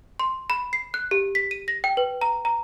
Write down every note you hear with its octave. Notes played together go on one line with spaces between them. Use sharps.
C6
B5
C7
F#6
G4
B6
D#7
A#6
G5
B4
A#5
A#5